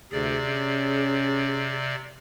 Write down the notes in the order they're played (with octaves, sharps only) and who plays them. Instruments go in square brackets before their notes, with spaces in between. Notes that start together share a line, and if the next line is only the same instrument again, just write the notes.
[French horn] D2 [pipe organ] C3 D5 [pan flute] G#4
[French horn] C#4